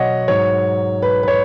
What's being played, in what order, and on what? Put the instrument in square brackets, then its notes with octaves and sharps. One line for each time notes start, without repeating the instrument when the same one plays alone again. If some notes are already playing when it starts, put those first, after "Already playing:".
Already playing: [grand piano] B2 F#3 C#5 D#5 F#5
G#2 F#3 C#5
B4
B4
C#5